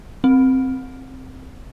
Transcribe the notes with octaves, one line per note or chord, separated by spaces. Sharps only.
C4